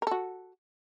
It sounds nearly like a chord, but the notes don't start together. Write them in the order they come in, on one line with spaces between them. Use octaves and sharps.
A#4 A4 F#4